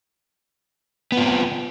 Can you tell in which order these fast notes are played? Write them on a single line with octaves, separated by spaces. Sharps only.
B3 F4 C4